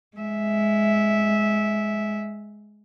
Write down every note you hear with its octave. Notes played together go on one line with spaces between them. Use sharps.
G#3 E5